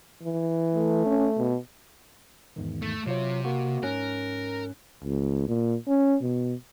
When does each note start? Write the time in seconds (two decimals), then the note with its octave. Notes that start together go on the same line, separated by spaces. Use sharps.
0.23 E3
0.74 A3
1.06 C#4
1.37 B2
2.56 E2 G#2 D#3
2.82 A3
3.06 C3 F#3 F4 C#5
3.45 A#3 F#4
3.83 G#2 C#4 A#4 F#6
5.04 C#2
5.48 A#2
5.88 C#4
6.22 B2